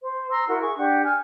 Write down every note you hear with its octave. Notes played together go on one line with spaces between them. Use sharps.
C5
A#5 C6 E6
E4 F#4 A#4
G#4 C#6
D4 G4 F#5
G#5 F6